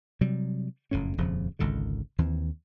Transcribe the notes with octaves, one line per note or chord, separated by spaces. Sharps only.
C3 F#3 G3
F#1 F2 A2 C#4
D#1 F2 C#3 F3
G#1 C#2 D3 D#3
D#2 E3 C4